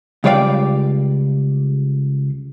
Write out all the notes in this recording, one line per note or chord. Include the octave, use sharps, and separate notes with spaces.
C#2 G3 C#5 D5 F5 G5